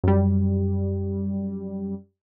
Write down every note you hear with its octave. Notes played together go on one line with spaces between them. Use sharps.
F#2 G3